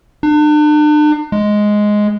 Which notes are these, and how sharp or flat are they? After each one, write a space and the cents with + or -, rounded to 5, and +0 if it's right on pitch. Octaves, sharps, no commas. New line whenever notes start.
D4 +40
G#3 +5